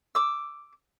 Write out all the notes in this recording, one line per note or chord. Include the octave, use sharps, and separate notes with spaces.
D6 E6